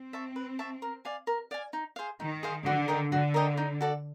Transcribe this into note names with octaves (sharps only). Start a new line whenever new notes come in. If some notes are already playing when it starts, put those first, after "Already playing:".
Already playing: C4
E5 A5 C#6
B4
E5 A5 C#6
A#4
D5 F5 G#5
A#4
D5 F5 G#5
D#4
G#4 C5 F5
D#3 D#4
G#4 C5 F5
D3 F#4
A#4 D#5 G5
D3 F#4
A#4 D#5 G5
D#4
F#4 A4 D5